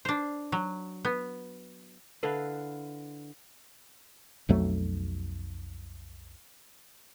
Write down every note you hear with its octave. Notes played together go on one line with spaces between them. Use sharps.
D4 C5
F#3
B3
D3 E4 B4 F5
B1 F2 F#3 A3